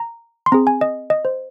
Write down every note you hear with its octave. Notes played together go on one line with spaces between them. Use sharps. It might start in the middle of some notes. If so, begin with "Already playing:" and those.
Already playing: A#5
C6
C4 G#4 A#5
G#5
D#5
D#5
C5